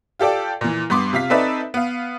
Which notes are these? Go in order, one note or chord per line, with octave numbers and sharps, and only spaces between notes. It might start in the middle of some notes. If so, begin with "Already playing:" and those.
F4 G4 A4 D5 G5
A#2 E3
G2 B3 C6 D6
C3 F4 F5 B6
C4 D#4 A4 B4 D5 E5
B3 F5